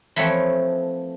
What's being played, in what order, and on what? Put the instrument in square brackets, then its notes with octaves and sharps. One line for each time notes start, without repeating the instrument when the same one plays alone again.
[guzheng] E3 F3 A3 C4 C#5